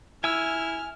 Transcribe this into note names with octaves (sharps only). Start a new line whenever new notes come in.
E4 G#5 E6 F6